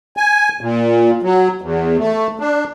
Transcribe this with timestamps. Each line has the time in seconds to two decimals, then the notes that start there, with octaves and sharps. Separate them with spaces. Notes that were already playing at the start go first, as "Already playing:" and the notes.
0.17 G#5
0.61 A#2
1.23 F#3
1.62 E2
1.98 A3
2.40 D4